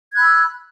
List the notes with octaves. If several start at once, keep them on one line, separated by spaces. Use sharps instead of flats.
B5 E6 F#6 G#6